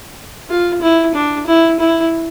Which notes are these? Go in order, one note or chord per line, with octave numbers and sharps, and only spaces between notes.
F4
E4
D4
E4
E4